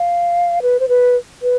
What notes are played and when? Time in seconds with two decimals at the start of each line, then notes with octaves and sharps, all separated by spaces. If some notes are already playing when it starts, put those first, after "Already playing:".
Already playing: F5
0.62 B4
0.80 C5
0.89 B4
1.42 B4